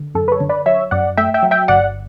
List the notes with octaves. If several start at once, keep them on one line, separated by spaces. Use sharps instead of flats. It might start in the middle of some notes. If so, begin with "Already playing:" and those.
Already playing: D3
F#2 A4
B4
A4 C#5
D3
B4 D5
F#3 C#5 E5
F#2 D5 F#5
A3 E5 G5
E5 G5
F#3
E5 G5
G1 D5 F#5